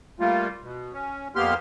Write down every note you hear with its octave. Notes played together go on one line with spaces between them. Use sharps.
G3 A3 A#3 F4
B2
C#4
F2 A#3 B3 G4 C6 F6